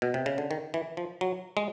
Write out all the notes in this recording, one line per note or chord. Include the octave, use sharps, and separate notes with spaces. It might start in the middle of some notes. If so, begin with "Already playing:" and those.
B2
C3
C#3
D3
D#3
E3
F3
F#3
G#3